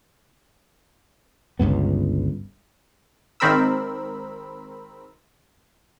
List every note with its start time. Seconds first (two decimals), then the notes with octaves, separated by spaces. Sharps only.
1.59 G1 C#2 G2 B3
3.40 G#1 D#3 C4 A#4 B5 E6